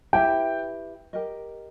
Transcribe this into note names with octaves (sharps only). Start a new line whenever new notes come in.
E4 G4 B4 E5 G5
G4 A#4 D#5